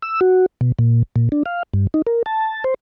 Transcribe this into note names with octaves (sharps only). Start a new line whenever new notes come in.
E6
F#4
B2
A#2
A#2
D4
F5
G2
D#4
A#4
A5
C5